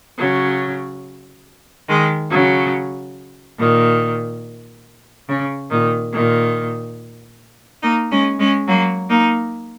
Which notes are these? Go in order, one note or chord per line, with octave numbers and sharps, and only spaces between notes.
C#3 F#3
D#3 G#3
C#3 F#3
A#2 D#3
C#3
A#2 D#3
A#2 D#3
A#3 D#4
G#3 C#4
G#3 C#4
F#3 A#3
A#3 D#4